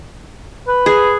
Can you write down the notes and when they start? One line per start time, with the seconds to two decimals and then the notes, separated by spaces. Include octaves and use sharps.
0.68 B4
0.86 G#4